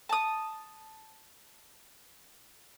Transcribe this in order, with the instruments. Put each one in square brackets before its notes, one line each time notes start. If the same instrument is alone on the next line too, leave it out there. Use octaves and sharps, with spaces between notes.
[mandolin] A5 D#6